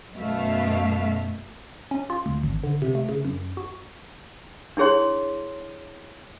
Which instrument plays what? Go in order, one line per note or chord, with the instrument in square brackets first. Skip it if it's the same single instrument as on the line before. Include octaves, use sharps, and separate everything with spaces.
[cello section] F#2 B2 A3 E5 F5
[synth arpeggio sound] C#4
F4
D2
G#1
D3
C3
A3
C#3
F#2
F#4
[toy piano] D4 E4 G#4 C#5 C6